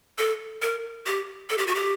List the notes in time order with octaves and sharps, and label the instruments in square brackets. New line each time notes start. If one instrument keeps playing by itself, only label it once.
[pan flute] A4
A#4
G4
A4
G4
F#4
G4